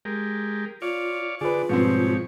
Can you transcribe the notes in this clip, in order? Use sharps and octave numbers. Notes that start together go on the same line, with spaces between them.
G#3 G4 A#4
F4 C#5 D5 F5
D3 F4 G#4 B4 D5
G#2 B2 F3 G3 C4 C#5